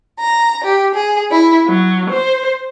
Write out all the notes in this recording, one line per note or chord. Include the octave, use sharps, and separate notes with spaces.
A#5
G4
G#4
E4
F#3
C5